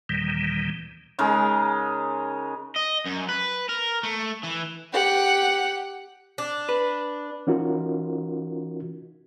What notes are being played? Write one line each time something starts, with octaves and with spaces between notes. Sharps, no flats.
D#2 A#2 D#3 E3 G3
C#3 G#3 D#4 A#4
D#5
F#2
B4
A#4
A3
E3
G4 F#5
D4
B4
E3 C#4 D#4 F4 F#4 A#4